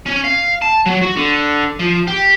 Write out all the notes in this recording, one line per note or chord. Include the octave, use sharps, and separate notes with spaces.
C#4
F5
A5
F#3
F#4
D3
F3
G4